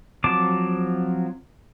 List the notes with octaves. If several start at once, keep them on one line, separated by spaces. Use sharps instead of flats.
F3 F#3 C4 A5 D6